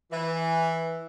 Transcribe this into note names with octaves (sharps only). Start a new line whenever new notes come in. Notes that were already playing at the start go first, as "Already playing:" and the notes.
E3